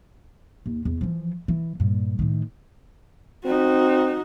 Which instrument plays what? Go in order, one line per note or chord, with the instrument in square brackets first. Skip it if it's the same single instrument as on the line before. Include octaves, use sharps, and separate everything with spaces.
[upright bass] D#2
E2
E3 F3
E3
G2 A#2
A2 D#3
[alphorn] C4 [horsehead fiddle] D#4 F#4